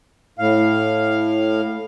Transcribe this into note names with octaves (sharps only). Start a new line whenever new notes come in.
A2 F5